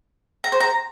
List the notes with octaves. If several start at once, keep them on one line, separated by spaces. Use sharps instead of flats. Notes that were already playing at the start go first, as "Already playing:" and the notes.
A#5
C5
A#5